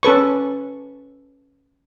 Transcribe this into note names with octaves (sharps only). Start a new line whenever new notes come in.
C#4 A4 B4 C#6